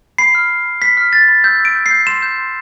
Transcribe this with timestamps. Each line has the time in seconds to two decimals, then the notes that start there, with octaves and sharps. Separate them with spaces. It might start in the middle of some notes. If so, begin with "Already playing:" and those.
0.18 B5 C7
0.35 F6
0.50 F6
0.66 B5
0.82 F6 B6
0.97 F6
1.12 F6 A6
1.28 B5
1.44 E6 G6
1.60 E6
1.65 D7
1.75 G6
1.86 C7
1.91 G6
2.07 C6 E7
2.22 G6
2.38 C6